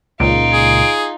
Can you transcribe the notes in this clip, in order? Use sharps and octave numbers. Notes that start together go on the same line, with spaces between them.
C#2 A#2 D#4 F4 D7
G#4